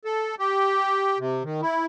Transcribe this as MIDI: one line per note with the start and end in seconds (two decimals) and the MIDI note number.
0.05 0.35 69
0.39 1.18 67
1.19 1.43 48
1.43 1.61 51
1.62 1.86 64